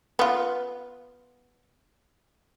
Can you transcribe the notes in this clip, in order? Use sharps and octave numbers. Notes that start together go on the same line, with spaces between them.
B3 F4